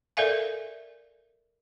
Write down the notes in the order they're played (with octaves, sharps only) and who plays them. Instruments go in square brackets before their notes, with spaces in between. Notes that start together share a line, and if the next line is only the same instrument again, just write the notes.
[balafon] A4 A#4 D5 E5 F5 G#5